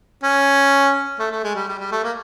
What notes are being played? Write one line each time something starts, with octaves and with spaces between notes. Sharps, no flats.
C#4
A3
A3
G#3
G3
G3
G3
A3
A#3